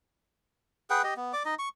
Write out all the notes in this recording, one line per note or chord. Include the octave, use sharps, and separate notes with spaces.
G#4 B4 F#5 G5
G4 D#5
B3
D5 D6
D#4 D#5
C#6